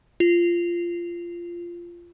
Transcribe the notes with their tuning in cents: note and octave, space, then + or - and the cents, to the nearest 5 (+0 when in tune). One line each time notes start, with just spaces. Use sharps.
F4 -15